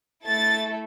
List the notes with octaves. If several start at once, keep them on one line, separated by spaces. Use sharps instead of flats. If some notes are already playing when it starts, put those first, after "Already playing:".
A3 E4 A4 A6